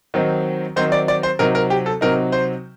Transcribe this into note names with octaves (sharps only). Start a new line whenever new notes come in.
D#3 F#3 C4 D#4
D#3 F#3 C4 D#4 C5
D5
D5
C5
C3 F#3 C4 D#4 A#4
A#4
G4
A4
C3 F#3 C4 D#4 A#4
C5